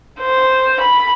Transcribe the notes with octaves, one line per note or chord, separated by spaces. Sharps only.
C5
B5